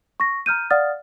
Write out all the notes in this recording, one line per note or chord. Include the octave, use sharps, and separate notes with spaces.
C#6 A#6
A#5 F6 G6 D#7
D5 F5 F#5 D#6 F6 A6